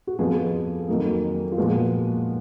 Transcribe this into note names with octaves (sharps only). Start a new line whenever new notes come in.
F#4
F2 F3 B3 G#4
F2 D#3 F#3 A#3
F4
A#2 F3 G#3 B3 F#4